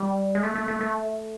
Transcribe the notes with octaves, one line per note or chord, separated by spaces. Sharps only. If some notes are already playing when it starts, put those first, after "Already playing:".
Already playing: G3
G#3
A3
A3
A3
A3